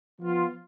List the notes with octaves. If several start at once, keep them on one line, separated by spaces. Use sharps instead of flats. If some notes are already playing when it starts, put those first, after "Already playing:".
F3 B3 F4